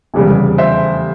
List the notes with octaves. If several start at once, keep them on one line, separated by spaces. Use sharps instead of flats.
F1 E2 C#3 G3
C5 E5